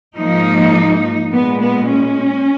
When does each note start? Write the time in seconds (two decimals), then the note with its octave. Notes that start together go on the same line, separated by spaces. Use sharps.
0.17 G#2 F3 A#3 D#4
1.31 A#2 G#3 B3
1.59 B3
1.88 C#4